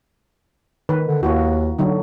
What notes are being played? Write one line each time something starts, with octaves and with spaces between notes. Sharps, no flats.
D#3 B4
D3
D#2 A#3 E4 F#4
D3 F#3 D#4